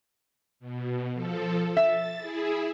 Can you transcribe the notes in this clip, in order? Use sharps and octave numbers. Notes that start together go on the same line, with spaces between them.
B2
F3 A4
E5 A6
E4 G#4